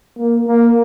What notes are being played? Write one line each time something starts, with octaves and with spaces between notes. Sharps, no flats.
A#3
A#3